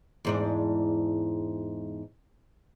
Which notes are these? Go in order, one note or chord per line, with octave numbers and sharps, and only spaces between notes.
E2 G#2 D4